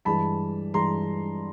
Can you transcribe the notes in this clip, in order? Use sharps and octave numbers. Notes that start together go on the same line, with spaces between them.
G2 E3 G#3 A5 B5
G2 E3 G#3 A#5 C6